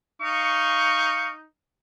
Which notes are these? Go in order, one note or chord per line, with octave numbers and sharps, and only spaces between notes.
D#4 F5 C#6